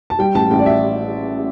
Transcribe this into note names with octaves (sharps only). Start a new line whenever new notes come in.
A5
G3 G5
A1 A5
A1 G5
D5
E5